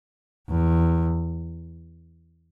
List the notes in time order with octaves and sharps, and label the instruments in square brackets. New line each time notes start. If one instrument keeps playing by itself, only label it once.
[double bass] E2